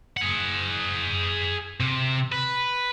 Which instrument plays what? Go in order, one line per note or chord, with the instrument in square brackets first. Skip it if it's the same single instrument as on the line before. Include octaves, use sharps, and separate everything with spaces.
[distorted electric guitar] G#4 F#5
C3
B4